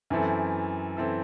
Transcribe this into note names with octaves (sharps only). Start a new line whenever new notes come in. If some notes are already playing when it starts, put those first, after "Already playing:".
F#2 E3 C4 E4 A4
E3 C4 E4 A4